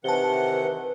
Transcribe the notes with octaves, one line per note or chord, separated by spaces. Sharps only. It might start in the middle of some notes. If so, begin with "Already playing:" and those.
C3 D#3 E3 B4 F#5 A5 G7